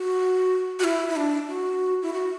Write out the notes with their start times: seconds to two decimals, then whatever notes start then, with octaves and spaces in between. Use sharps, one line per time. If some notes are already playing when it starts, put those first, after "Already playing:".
Already playing: F#4
0.79 F#4
0.84 E4
1.09 E4
1.16 D4
1.49 F#4
2.02 E4
2.13 F#4